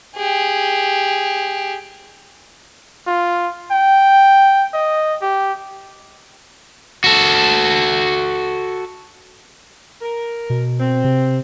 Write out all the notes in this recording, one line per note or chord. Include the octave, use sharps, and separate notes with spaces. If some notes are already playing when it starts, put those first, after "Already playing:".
G4 G#4
F4
G5
D#5
G4
F#4 A4
A#4
B2
C4
C3